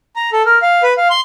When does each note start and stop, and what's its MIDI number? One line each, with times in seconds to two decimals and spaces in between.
0.16 0.30 82
0.33 0.42 69
0.46 0.58 70
0.62 0.82 77
0.83 0.93 71
0.97 1.08 77
1.10 1.21 84